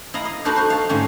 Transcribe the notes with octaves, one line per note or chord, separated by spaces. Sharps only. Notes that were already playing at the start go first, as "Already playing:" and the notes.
E4 D#5 F5 A#5
D#5
D4 D#4 F#4 A4 B4 C5
F#4 C5
F5 A5
G#2 D3 A3 C4 C#4